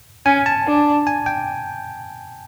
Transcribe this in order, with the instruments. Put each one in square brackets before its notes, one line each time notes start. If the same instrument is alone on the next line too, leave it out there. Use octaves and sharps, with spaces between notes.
[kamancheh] C#4 [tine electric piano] G#5
[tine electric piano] A5
[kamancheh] D4
[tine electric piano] G#5
G5